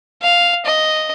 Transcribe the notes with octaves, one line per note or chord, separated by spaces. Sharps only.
F5
D#5